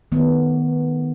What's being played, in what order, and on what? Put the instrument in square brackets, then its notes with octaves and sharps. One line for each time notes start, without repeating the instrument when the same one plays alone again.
[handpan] D#3 A3 B3